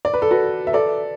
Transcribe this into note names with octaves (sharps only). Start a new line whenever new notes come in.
D5
B4
A4
F#4 B4
E5
A4 D5